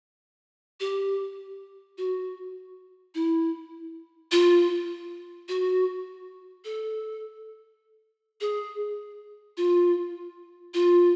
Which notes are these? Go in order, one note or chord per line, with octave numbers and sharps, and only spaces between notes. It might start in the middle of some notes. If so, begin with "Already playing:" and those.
G4
F#4
E4
F4
F#4
A4
G#4
F4
F4